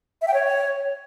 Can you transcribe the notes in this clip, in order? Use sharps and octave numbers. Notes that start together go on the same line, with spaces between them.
E5
G5
C#5